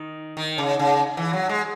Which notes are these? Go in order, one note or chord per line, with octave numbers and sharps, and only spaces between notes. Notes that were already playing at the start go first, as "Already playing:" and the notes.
Already playing: D#3
D#3
C#3
C#3
E3
F#3
G#3